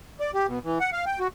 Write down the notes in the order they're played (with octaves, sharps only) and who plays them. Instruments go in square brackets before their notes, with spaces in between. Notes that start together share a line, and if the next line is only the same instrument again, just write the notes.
[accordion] D5
G4
B2
E3
F#5
F5
G5
F#4